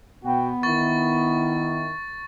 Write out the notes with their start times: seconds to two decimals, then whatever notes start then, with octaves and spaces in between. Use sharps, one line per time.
0.24 B2 B3 F#4 G5
0.63 D#3 E4 C#6 A6